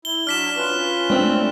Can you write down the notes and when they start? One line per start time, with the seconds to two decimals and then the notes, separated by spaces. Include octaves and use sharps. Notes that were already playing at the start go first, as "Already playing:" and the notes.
0.05 E4 G7
0.27 F#3 D4 D5 F6 B6 E7
0.57 C#4 F4 B4
1.10 G#3 A3 C4 D4